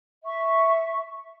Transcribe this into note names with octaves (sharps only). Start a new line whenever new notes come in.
E5 C#6